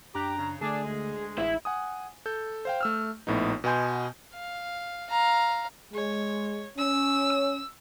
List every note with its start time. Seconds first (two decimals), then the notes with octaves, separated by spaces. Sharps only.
0.15 F#2 D4 G4 A#5 F#6
0.37 C#3
0.61 D3 A3 D4 G#4 D#6
0.84 D2 G#3
1.38 A1 E4
1.65 F#5 G#5 D#6
2.26 A4 G6
2.65 C5 F5 G5
2.81 A3 E6 F6
3.27 A#1 A2 B3 D#4
3.64 B2 B3 D#5 G#5 C6 G6
4.33 F5
5.09 F5 A#5
5.94 G#3 C#5
6.78 C#4 E6